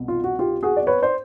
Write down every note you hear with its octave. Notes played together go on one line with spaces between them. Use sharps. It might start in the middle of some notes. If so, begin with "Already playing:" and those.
Already playing: C2 B2
F4
F#4
F4 G4
F#4 G#4
D5
B4 C#5
C5 D5